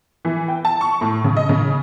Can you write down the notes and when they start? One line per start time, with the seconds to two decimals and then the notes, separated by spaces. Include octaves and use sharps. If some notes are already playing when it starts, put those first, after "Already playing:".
0.25 E3
0.48 G5
0.65 A5
0.81 C#6
1.01 A2
1.24 C#3
1.37 D#5
1.49 C#3